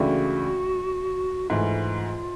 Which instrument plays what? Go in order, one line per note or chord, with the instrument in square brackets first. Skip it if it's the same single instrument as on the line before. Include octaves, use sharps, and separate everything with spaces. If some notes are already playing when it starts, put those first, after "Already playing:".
Already playing: [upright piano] C#2 C#3 E3 A3 D4 [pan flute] F#4
[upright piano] G#2 E3 A3 [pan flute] F4